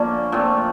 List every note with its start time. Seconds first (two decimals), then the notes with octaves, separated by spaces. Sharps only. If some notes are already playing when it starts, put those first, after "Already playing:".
Already playing: D3 F3 A#3 C#4
0.32 A#2 F3 A3 C4